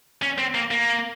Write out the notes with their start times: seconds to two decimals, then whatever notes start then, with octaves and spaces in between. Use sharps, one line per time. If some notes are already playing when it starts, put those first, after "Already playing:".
0.22 C#4
0.38 C4
0.55 A#3
0.71 A#3